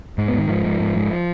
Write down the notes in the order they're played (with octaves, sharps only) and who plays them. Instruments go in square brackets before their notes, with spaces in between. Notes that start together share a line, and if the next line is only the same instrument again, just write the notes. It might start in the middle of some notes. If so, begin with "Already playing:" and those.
[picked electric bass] G#2
B3
G#2
D#3
G#2 F3
G#2
G#2
G#2